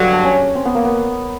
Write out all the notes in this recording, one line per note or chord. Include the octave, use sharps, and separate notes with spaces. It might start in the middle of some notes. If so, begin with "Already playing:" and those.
Already playing: G2 D3 F#3
D4
C#4
C4
B3
A#3
B3